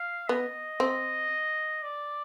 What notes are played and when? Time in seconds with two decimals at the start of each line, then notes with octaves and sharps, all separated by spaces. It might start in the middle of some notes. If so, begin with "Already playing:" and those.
Already playing: F5
0.29 B3 D#5
0.80 C4
1.83 D5